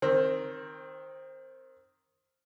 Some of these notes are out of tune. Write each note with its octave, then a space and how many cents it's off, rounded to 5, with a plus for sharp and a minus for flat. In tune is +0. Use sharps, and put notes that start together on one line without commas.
D#3 +0 C4 +15